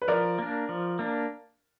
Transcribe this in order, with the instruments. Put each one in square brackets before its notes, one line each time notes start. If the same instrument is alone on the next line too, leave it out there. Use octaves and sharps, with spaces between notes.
[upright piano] B4
[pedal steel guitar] F3 [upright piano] A#4 D5
[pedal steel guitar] A#3 D4
F3
A#3 D4